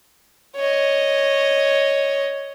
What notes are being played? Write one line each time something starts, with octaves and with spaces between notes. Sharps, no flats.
C#5 D#5